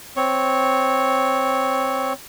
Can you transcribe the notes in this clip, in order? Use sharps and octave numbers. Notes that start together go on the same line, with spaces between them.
C4 C#5